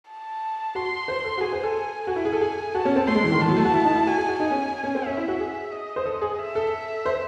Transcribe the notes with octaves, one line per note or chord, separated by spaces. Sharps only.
A5
F#4 C6
C5
A4
F#4
G#4 G#5
C5
A4
F#4 G#5
E4
G#4
A4
G#4
F#4 A5
C#4
C4
A3 C6
G#3
E3
D#3
E3 A5
F#3
A3
F#4
E4
D#4
E4
F#4 G#5
G#4
F#4
D#4 G#5
C#4
C#4
C4
C#4 E5
E4
F#4
G#4
D#5
C5
A4
G#4
E5
A4
E5
C5